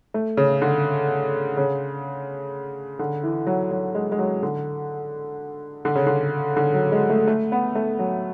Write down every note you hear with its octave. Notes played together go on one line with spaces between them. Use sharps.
A3
C#3
D3
C#3
D3
E3
F#3
F#3
G#3
G#3
F#3
D3
D3
C#3
D3
D3
F#3
G#3
A3
A3
B3
A3
F#3